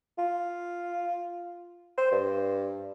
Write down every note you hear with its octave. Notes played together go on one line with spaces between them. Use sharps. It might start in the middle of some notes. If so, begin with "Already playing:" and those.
F4
C5
G2